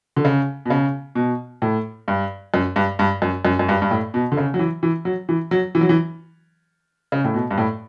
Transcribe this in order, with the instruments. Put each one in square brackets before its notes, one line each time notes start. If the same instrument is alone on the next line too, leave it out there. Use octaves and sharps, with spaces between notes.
[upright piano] D3
C#3
B2
C#3
B2
A2
G2
F#2
G2
G2
F#2
F#2
F#2
G2
G2
A2
B2
D3
C#3
F#3
E3
E3
F#3
E3
F#3
E3
F#3
E3
C#3
A2
B2
G2
A2